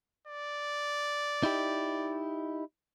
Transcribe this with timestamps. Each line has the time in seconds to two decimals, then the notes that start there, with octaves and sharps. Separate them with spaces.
0.27 D5
1.43 D#4 E4 G4